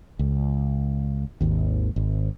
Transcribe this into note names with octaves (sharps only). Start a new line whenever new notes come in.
C#2
G#1 D#2
G#1